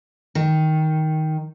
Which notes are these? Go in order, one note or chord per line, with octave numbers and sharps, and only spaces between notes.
D#3